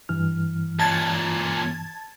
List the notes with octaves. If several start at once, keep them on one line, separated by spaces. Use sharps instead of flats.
G2 E3 F6
C#2 A#2 A5 G#6 A6